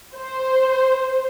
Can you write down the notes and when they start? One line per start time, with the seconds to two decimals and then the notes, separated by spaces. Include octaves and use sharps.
0.16 C5